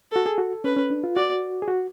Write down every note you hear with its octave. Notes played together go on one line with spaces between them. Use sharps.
F#4 A4
G#4
F#4
C#4 B4
C#4
D4
F4
F#4 D5
G#4
F#4